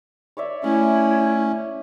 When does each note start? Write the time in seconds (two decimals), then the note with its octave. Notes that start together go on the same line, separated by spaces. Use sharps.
0.37 C#5 D5 E5
0.64 A3 C#4 E4 E5